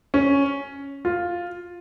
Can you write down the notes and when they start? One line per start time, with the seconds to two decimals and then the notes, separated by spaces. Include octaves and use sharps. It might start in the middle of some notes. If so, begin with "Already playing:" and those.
0.14 C#4
1.05 F4